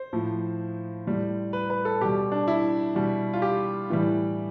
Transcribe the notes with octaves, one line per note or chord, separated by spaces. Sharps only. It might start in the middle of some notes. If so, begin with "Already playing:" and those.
Already playing: C5
A2 F3
A2 G3
B4
B4
A4
B2 G3 G4
D4
E4
B2 G3
F4
G4
A2 E3 G3